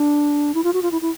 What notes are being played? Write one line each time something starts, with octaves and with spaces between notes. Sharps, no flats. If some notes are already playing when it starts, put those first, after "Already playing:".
Already playing: D4
E4
F4
F#4
F4
E4
E4